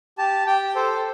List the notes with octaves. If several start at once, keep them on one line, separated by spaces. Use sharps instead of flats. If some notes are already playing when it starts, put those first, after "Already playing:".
G4 A5
G4 G5
A4 C5